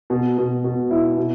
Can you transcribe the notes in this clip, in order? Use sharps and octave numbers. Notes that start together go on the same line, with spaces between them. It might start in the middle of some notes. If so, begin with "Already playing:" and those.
B2
B2
B2
E4
B2